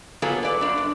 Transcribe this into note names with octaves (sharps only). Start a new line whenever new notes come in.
F#3 A#3 B3 F4 G#4 A4
B4 D5
F#2 D4
G2